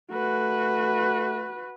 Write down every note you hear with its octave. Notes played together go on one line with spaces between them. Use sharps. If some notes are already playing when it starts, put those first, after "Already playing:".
A3 F#4 B4